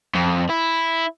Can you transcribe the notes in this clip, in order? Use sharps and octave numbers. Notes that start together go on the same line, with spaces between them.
F2
E4